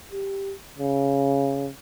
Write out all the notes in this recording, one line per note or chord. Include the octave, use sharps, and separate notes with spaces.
G4
C#3